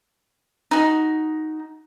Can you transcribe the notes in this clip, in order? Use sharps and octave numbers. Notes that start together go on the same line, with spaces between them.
D#4 F#4